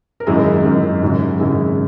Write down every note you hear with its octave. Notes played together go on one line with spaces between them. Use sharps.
A#4
G#1 F#2 D#3 E4 G#4
G#1 F#2 D#3
G#1 F#2 C#3
G#1 F#2 C#3 E4 G#4